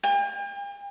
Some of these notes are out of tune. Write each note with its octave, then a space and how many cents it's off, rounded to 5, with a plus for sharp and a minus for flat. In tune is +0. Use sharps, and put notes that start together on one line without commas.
G5 +45